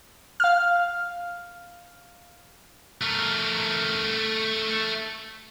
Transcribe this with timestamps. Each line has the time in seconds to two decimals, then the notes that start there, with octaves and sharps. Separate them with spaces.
0.40 F5 F6
3.01 A3 A#4